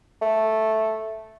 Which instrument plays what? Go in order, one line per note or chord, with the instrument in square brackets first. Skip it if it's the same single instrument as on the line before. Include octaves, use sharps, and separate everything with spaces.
[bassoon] A3